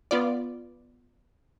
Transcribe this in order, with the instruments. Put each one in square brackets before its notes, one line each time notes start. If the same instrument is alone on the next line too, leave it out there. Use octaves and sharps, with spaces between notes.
[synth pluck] B3 F4 D5